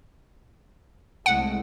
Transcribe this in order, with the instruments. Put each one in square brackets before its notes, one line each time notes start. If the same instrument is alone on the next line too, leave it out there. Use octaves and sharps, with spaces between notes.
[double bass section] C2 G#3 A3 [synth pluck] F#5